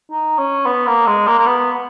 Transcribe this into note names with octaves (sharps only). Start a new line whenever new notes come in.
D#4
C#4
B3
A#3
G#3
A#3
A#3
B3